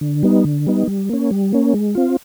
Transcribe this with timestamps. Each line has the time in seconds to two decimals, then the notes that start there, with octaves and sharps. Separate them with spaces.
0.01 D3
0.23 G3 B3 D#4
0.45 D3
0.67 G3 B3 D#4
0.87 G3
1.09 A#3 C#4
1.31 G3
1.53 A#3 C#4
1.74 G#3
1.95 C4 F4